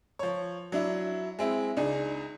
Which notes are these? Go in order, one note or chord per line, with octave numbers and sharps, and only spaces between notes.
F3 C#5
F#3 D4 E4
G#3 C4 E4
C#2 D4 D#4 G#4